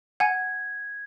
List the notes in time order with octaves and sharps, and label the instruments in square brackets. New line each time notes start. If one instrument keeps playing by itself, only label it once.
[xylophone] F#5 G#5 [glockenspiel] G#6